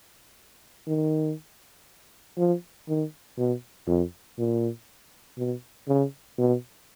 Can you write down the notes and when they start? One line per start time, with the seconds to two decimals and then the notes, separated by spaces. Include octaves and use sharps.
0.88 D#3
2.38 F3
2.88 D#3
3.38 B2
3.87 F2
4.38 A#2
5.38 B2
5.88 C#3
6.38 B2